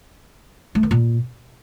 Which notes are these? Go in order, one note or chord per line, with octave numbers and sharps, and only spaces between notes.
A3
D#3
A#2